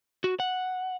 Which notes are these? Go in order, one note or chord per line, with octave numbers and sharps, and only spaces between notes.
F#4
F#5